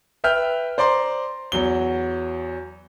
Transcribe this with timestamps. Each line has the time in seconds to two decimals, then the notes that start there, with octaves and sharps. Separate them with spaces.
0.24 B4 E5 G5 F6 G6
0.78 C5 D5 A#5 C6
1.52 E2 F#3 G7